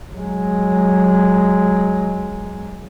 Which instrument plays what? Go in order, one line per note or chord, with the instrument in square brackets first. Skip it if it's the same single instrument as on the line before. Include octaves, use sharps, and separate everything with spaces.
[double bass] F#3 G#3